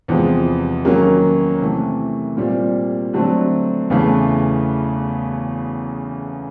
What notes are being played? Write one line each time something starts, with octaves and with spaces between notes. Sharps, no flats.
E2 C3 F3 G#3
D#3 F#3 A#3 C#4
C3 E3 A3
A#2 G3 C4
D3 F#3 A3 C4
E2 C#3 E3 A3